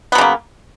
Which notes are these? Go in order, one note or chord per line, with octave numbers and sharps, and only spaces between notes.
C#3 F#3 A#3 B3